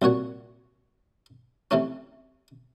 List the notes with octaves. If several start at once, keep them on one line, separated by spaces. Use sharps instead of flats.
C2 A#2 F#4 C#5
C3 E3 A3 C#4